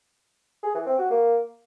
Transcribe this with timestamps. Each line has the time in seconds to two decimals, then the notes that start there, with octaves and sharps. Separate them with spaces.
0.63 G#4
0.75 E3
0.87 C4
0.99 F#4
1.10 A#3